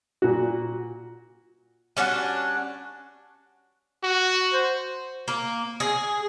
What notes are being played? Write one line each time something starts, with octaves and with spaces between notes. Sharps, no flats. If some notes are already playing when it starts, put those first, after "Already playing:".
A#2 F#4
G3 C#4 D4 F#4
F#4
C5
A#3
G#4